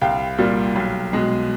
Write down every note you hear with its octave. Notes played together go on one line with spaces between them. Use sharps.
C2 F5 G5
A#2 G3 A#3
B1
B2 G#3